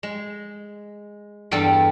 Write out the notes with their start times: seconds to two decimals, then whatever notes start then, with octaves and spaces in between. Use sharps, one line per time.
0.03 G#3
1.51 E2 G2 G3 A4 A5